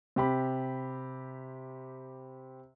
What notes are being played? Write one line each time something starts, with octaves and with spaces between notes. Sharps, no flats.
C3 G4 B5